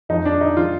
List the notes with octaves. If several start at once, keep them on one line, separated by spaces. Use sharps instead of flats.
F2 F3 D#4
D4
D#4
F3 F4